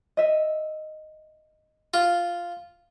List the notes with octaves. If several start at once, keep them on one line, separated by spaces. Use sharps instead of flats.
D#5 E5
F4